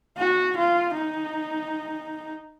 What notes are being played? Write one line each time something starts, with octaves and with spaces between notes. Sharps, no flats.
F#4
F4
D#4